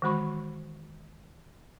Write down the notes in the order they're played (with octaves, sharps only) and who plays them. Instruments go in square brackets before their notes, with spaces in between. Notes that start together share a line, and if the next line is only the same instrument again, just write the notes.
[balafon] D#3 E3 G#3 F#4 B5 C#6